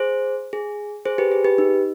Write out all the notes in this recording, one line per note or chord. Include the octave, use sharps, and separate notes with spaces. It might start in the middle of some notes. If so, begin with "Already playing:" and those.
Already playing: G#4 C5
G#4
G#4 C5
G4 B4
G#4
G4 B4
D#4